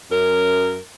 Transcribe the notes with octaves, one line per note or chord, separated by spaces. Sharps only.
F#2 A#4